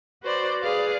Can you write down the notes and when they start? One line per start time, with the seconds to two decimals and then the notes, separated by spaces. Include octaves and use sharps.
0.22 F#4 B4 C5 D5
0.62 G#4 B4 D5 F5